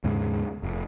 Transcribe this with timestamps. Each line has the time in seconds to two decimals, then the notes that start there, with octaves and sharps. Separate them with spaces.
0.04 D#2 G#2 C#3 G#3
0.63 F1